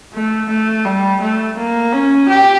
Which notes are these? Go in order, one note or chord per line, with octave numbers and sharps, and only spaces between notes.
A3
A3
G3
A3
A#3
C#4
G4